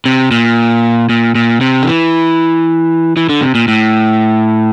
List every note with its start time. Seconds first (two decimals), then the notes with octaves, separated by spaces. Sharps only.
0.06 C3
0.31 A#2
1.09 A#2
1.35 A#2
1.61 C3
1.83 D3
1.87 E3
3.17 E3
3.29 D3
3.42 C3
3.55 A#2
3.68 A2